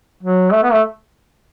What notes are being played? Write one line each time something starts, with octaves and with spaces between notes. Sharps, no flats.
F#3
A3
B3
A3